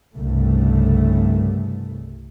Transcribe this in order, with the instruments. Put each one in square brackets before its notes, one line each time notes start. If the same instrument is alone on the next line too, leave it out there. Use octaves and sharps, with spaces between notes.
[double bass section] C2 G2 C#3 A3